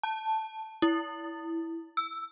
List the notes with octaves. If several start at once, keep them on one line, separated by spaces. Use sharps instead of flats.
A5
E4
E6